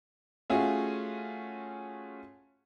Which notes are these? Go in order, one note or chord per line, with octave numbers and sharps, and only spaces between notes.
A3 C#4 F4 F#4 G#4